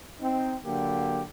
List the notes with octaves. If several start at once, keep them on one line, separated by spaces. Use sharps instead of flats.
C4 D#4
D3 F#3 A#3 G4